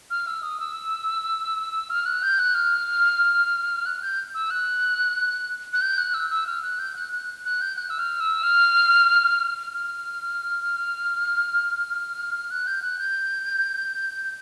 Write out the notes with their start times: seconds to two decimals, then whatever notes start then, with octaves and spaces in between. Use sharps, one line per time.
0.11 F6
0.27 E6
0.43 D#6
0.60 E6
1.90 F6
2.06 F#6
2.23 G6
2.39 F#6
2.55 F6
3.86 F#6
4.02 G6
4.34 E6
4.51 F#6
5.73 F#6
5.81 G6
5.98 F#6
6.14 E6
6.30 E6
6.47 F6
6.62 F#6
6.79 G6
6.96 F#6
7.13 F#6
7.45 F#6
7.61 G6
7.78 F#6
7.90 E6
7.99 F6
8.20 E6
8.43 F6
9.73 F6
12.51 F#6
12.67 G6
12.82 F#6
12.99 G6